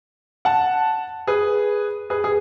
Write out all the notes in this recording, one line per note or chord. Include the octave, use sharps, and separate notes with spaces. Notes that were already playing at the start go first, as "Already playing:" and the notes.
F#5 A5
G#4 B4
G#4 B4
G#4